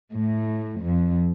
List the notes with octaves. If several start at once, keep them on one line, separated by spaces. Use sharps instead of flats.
A2
F2